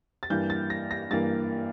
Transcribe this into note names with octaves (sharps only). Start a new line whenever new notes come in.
A6
G2 E3 A#3 G6
A6
A#6
A#6
G2 E3 A#3 A6